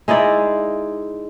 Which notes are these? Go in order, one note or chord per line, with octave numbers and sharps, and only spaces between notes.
G#3 D#4 E4 D5